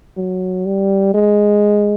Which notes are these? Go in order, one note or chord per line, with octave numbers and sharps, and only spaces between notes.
F#3
G3
G#3